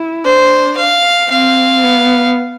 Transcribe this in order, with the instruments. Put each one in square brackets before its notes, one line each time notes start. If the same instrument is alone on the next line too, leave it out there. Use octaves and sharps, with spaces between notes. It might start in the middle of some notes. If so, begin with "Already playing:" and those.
Already playing: [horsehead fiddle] E4
[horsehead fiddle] D4 [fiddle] C5
[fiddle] F5
[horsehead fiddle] C4 [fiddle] F5
[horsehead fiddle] B3